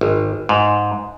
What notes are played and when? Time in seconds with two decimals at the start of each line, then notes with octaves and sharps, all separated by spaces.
0.01 G#1
0.49 G#2